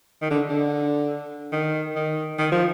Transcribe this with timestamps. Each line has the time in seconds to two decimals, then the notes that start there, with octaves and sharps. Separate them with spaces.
0.22 D#3
0.31 D3
0.49 D3
1.52 D#3
1.96 D#3
2.39 D#3
2.52 F3